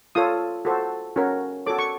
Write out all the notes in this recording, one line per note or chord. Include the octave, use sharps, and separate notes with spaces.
F4 A4 C#5 D#6
F#4 A4 C5
C#4 F#4 A#4 C#5
F#4 A4 C#5 D6
C#6